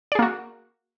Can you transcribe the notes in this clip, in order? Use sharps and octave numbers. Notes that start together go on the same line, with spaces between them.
A#3 F#4 G#4 D5